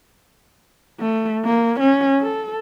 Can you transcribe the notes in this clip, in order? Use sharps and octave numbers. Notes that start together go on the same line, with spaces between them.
A3
A#3
C#4
A4